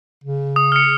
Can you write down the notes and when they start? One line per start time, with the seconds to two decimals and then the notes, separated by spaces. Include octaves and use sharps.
0.24 C#3
0.56 D#6
0.72 F6 C#7